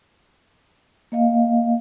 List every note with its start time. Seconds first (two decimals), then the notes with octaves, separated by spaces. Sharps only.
1.12 A#3 D#5 F5